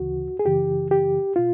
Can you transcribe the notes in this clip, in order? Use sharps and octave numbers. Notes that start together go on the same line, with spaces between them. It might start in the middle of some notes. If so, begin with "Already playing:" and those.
Already playing: D2 C#3 E3 F#4
G#4
F#2 C#3 E3 G4
G4
B2 F4